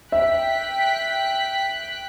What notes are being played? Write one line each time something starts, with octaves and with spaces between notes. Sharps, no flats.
E5 G5 F#6 B6